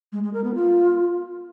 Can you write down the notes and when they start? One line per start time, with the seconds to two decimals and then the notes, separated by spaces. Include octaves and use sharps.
0.12 G#3
0.23 G#3
0.33 A#4
0.44 B3
0.55 F4